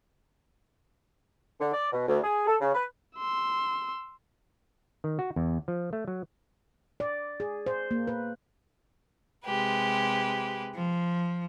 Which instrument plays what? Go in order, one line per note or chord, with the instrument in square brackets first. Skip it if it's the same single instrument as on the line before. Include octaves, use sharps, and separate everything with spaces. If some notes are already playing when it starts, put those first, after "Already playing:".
[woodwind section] D3
D5
B2
D2
G#4
A4
C#3
B4
[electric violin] C6 E6
[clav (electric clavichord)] D#3
F#4
E2
F3
A3
F#3
[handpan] D5
G#4
C5
A#3
B4
[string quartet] C3 G#3 G4 B4
F3